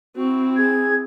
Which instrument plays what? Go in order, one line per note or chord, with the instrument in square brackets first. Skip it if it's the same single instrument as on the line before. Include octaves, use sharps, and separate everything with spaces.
[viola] C4 E4 [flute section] F#4
[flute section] G#4 G#6